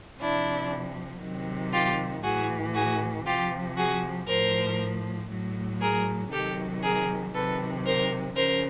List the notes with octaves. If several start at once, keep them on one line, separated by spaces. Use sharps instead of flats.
C3 F3 D4 E4
C3 D#3 F#3
F4 G4
A2 E3 F#4 G#4
F#4 G#4
C3 F3 F4 G4
F#4 G#4
A2 F3 A#4 C5
A2 F#3
G#4 A#4
C3 D#3 F#3 G4 A4
G#4 A#4
C3 D#3 F#3 A4 B4
A#4 C5
C#3 F3 A#4 C5